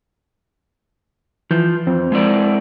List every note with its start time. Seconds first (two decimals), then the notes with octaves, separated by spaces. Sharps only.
1.51 E3 F3 G6
1.87 F2 C4
2.12 G#3 E4 D5